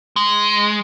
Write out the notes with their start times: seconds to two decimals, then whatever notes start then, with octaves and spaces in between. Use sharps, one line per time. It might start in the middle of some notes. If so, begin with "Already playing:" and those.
0.16 G#3